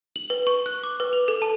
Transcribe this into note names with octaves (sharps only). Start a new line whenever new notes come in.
F#7
B4
C#6
F#6
D6
B4
F7
A4
A5